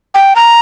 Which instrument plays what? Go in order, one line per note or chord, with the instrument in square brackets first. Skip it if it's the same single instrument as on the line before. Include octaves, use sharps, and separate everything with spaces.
[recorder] G5
A#5